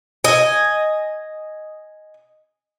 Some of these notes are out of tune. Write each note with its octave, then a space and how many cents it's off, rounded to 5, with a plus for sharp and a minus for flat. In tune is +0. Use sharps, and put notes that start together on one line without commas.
D#5 +0 G#5 +0